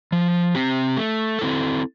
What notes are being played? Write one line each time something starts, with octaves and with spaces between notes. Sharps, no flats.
F3
C4 G4
A3
C4 E4 A4